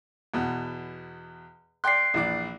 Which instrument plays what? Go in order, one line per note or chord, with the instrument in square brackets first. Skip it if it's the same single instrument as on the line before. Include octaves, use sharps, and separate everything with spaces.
[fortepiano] E2 B2
[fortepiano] D5 G5 C6 [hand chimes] F#6 C7
[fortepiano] A#1 E3 D5